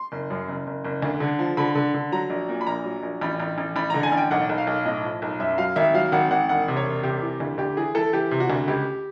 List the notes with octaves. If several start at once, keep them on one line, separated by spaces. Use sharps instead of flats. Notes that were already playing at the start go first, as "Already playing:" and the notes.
Already playing: C6
F#1
F#2
F#1
F#1
F#1
D2
D3
F3
D3 B5
D3
D3
F#3 A#5
A#1
A#2
B5
A#1 A#5
F#3
A#1
A1 B5
A1
A1
A1 B5
D3 A#5
G#5
A1
G5
B1 F#5
B1
F5
B1
A2 D#5
F3
B1
F#2 E5
F#3 F5
G#1 E5
F#3 F5
G#1 F#5
G#1 F#5
E1 F#5
C3
C#5
E1
C3 G4
E3
D2
D2 G4
E3 G#4
E3 A4
E3 G4
C3
F#4
D2
C#2 G4